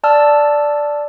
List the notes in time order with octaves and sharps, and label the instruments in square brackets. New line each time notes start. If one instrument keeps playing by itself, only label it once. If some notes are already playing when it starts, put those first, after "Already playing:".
[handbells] D5 A5 E6 F6